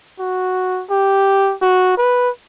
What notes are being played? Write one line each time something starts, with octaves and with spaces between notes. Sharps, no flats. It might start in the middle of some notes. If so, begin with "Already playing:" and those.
F#4
G4
F#4
B4